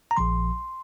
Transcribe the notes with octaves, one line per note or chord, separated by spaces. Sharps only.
A#5
A#1 A#2 F3 C6